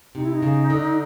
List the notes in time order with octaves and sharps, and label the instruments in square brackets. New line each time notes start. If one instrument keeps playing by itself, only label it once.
[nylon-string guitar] C3 [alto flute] D#4
[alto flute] E4
D#4
[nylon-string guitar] C#3
D3